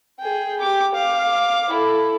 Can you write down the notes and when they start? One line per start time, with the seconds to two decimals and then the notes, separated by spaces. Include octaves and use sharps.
0.20 G#4 G5
0.59 G4 D6
0.94 F5 D6
1.70 E4 A4